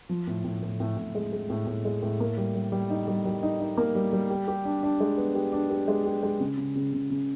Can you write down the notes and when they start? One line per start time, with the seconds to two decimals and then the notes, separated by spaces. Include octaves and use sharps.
0.09 F3
0.27 A2
0.44 A2
0.62 A2
0.80 A2
0.97 A2
1.15 G#3
1.33 G#3
1.50 A2
1.67 A2
1.85 G#3
2.02 A2
2.20 A#3
2.37 G3
2.55 G3
2.72 G3
2.90 D#4
3.08 G3
3.25 G3
3.43 D#4
3.61 D#4
3.77 A#3
3.95 G3
4.13 G3
4.30 G4
4.48 G4
4.65 D4
4.83 D4
5.00 G#3
5.18 B3
5.35 G4
5.52 D4
5.70 G4
5.88 G#3
6.06 G4
6.23 G#3
6.40 C#3
6.58 C#3
6.76 C#3
6.93 C#3
7.10 C#3